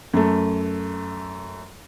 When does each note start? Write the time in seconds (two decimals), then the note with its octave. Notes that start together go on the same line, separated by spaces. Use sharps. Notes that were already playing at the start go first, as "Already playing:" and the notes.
0.13 F#2 A3